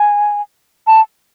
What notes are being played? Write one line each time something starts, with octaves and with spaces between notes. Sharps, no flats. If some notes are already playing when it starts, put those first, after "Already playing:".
Already playing: G#5
A5